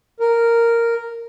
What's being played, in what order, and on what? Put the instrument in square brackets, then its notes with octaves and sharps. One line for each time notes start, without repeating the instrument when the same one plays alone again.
[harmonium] A#4